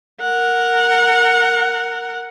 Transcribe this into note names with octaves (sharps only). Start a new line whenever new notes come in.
A#4 F#5